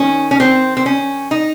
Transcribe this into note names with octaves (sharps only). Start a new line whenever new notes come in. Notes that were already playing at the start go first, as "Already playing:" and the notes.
Already playing: D#3 C#4
C#4
C4
C4
C#4
D#4